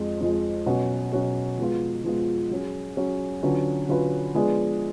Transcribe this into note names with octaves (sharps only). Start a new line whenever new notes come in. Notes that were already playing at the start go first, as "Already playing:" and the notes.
Already playing: F2 F3 G#3
F2 F3 G#3
B2 F#3 C#4 F#4
B2 F#3 C#4 F#4
F3 G#3 B3 F4
F3 G#3 B3 F4
F#3 C#4 G#4
F#3 C#4 G#4
D3 F#3 C#4 F4 B4
D3 F#3 C#4 F4 B4
F3 G#3 B3 D4 G#4